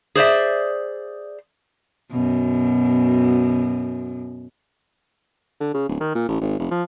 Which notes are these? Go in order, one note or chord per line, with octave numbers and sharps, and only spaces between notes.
G#4 C5 D5 E5
F#2 B2
D3
C#3
D1
D#3
A#2
A1
G#1
F1
F3